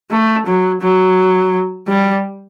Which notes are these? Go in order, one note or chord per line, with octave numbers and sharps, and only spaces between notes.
A3
F#3
F#3
G3